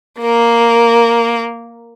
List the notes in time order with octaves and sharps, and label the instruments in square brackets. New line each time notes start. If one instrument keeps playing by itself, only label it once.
[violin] A#3 A#4